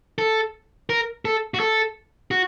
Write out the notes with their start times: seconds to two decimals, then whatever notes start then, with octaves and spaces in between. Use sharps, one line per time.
0.18 A4
0.90 A#4
1.25 A4
1.54 F#4
1.60 A4
2.31 F#4